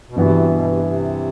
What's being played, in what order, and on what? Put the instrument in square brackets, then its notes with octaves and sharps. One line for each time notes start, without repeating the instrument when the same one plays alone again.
[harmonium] B2
[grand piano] G2 E3 B3 F#4 [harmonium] C3
[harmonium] B2
C3
C3